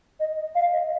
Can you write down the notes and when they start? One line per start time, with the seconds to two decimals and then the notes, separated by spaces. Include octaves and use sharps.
0.20 D#5
0.55 F5
0.72 D#5